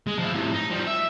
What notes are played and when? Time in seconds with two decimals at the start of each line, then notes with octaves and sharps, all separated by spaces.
0.07 G#3
0.19 F3 E4
0.34 A2 C3
0.54 D#4
0.71 F3 G3
0.87 E5